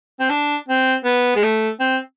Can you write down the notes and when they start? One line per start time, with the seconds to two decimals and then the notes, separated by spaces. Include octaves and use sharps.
0.20 C4
0.30 D4
0.68 C4
1.05 B3
1.36 G#3
1.43 A3
1.80 C4